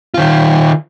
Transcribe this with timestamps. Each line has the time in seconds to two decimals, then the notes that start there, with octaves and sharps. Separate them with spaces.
0.14 D#3 F4